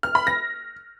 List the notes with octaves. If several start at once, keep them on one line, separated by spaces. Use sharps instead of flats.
F6
B5
A#6